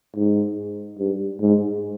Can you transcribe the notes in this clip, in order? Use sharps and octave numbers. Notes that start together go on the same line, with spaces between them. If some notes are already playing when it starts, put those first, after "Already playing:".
G#2
G2
G#2